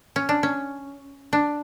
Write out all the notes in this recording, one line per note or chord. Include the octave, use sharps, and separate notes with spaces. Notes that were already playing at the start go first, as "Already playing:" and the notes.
C#4
D4
C#4
D4